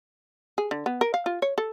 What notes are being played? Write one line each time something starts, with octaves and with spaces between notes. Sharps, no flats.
G#4
D3
B3
A#4
F5
F4
C#5
A4